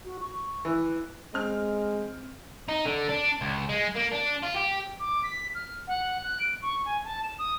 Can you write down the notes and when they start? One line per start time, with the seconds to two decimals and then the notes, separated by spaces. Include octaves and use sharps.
0.05 F#4
0.20 C#6
0.65 E3 B4
1.34 G#3 C4 F6
2.69 D#4
2.85 D3
3.09 D4
3.41 C#2
3.69 G#3
3.96 A#3
4.13 D4
4.43 F4
4.56 G4
5.00 D6
5.23 B6
5.55 F6
5.88 F#5
6.23 F#6
6.40 D7
6.62 C#6
6.86 G#5
7.05 A5
7.23 E7
7.39 D#6